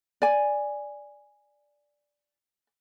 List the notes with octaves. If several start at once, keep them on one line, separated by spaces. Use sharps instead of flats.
D5 G#5